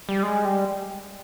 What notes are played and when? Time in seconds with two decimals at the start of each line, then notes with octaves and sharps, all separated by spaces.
0.09 G3
0.23 G#3
0.45 G3